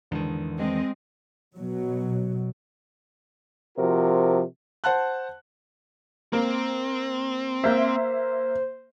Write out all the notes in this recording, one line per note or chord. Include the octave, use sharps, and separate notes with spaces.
E2 G#2 D3 D#3
G#3 C4 D#5
B2 F#3
C3 F3 F#4 A#4
C5 F#5 A5 F#6
A#3 C4
A#3 C5 E5